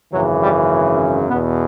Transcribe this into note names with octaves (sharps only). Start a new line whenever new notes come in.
G#1 F#2 C#3 E3 F#3
G3
E2 B2 B3